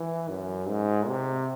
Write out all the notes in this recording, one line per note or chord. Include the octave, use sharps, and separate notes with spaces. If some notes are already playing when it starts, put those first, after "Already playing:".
Already playing: E3
F#2
G#2
C3